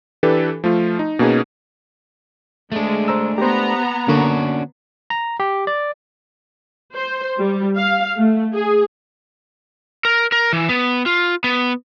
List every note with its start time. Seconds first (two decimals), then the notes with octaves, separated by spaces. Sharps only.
0.23 E3 D4 G4 A4 B4
0.64 F3 A3 F4
0.99 D#4
1.19 B2 A#3 C#4 D#4 G#4 B4
2.72 G#3 A3 D4
3.08 C5 A#5 E6
3.38 B3 G4 C5 A#5
4.08 D3 A#3 C#4 D4 F#4
5.10 A#5
5.40 G4
5.67 D5
6.96 C5
7.39 G3
7.77 F5
8.18 A3
8.54 G#4
10.05 A#4
10.32 A#4
10.53 E3
10.69 B3
11.06 F4
11.44 B3